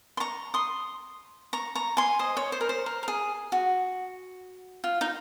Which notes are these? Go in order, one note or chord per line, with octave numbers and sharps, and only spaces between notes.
C6
A#5 C#6
C6 D#6
A#5 C#6
A#5 C#6
G#5 C6
C5 D#5
C#5
C5
A#4
C5
A#4
A#4
G#4
F#4
F4
D#4